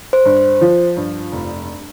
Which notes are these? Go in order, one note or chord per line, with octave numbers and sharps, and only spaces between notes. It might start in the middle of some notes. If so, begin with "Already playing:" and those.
C5
G2
C5
F3
G2
F1